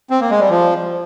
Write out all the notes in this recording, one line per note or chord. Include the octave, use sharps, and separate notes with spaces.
C4
A#3
G#3
G3
F3